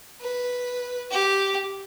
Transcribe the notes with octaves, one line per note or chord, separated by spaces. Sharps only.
B4
G4